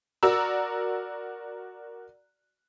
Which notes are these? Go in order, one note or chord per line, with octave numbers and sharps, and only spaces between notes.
F#4 A#4 D5 A#5 E6